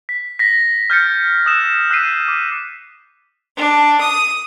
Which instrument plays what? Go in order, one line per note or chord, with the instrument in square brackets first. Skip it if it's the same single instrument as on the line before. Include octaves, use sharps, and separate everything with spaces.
[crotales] B6
A#6 B6
F6 G6 A6 C#7
D#6 E6 F#6 E7
E6 F#6 B6 C7 D#7
D6
[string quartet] D4
D#6